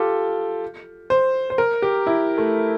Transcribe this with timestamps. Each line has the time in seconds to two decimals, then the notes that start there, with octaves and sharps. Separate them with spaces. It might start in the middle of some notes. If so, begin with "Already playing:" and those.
Already playing: F4 G4 A4
1.10 C5
1.50 C5
1.58 A#4
1.82 G4
2.07 E4
2.38 A3